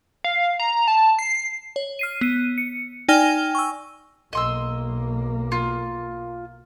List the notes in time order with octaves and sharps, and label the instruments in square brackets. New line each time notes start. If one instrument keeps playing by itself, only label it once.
[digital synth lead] F5
A#5
A5
C7
[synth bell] C#5
F6 C7 D#7
B3 D#7
C#7
D#4 D5 G5 G#5 F6 G7
C#6 E6
[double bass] B1 A#3 [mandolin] D#5 C6 E6
[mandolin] F4